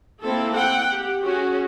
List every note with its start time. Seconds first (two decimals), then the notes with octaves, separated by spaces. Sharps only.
0.22 A#3 C4 E4 A4
0.55 F#5 G5
0.90 G4
1.21 C#4 F#4 G#4